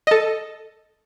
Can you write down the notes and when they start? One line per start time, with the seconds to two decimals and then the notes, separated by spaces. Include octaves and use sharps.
0.07 A4 D#5